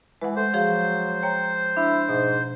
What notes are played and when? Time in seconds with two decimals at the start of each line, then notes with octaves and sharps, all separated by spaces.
0.22 E3 G#3 F#5
0.36 A3 C5
0.54 F3 F#3 G#4 F5
1.23 C#5 G5 A#5
1.77 D4 E4
2.09 G#2 B2